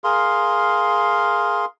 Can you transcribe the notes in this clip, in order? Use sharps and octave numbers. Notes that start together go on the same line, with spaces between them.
G#4 A#4 F5 C6